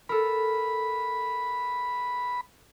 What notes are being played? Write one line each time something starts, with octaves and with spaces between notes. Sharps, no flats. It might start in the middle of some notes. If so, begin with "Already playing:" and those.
A4 A#4 B5